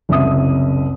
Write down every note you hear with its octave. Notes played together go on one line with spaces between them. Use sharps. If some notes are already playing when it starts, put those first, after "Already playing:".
F#1 C2 E5 D#6